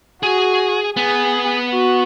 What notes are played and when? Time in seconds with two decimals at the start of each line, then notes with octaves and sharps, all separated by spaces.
0.23 F#4 G#4
0.97 B3 G#4
1.71 F#4